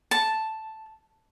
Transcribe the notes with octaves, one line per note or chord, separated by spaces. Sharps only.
A5